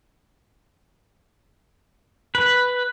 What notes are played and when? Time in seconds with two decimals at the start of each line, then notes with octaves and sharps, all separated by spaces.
2.35 B4